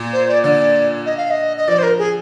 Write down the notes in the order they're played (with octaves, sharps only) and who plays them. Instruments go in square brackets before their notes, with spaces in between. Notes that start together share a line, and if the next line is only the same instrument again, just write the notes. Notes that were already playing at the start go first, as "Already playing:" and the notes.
Already playing: [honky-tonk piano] A#2
[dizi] C5
D5
[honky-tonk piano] D3 [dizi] D5
[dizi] D#5
F5
D#5
D#5
[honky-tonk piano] F3 [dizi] D5
[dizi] C5
A#4
G#4